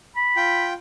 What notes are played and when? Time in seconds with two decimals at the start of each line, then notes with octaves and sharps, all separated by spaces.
0.16 B5
0.36 F4 G5